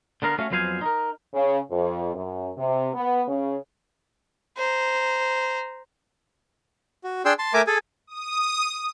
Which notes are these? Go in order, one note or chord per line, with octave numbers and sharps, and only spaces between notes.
D3 B3 A#4 F5
A3 C#4 F#4 F5
F2 F#3 B3 C5 F5 G#5
D#4 A#4
C#3
F2
F#2
C3
B3
C#3
C5 A#5
F#4
D4 G#4 G5 C6 E6
A5 C6
A3 A#4 E5 G#5 A#5 D6
G#4 A4 G#5
D#6